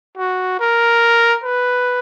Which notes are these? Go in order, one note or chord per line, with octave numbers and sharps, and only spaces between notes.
F#4
A#4
B4